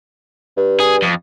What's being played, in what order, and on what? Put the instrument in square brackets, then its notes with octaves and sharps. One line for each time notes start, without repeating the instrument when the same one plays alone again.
[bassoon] G2
[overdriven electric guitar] G#4
F2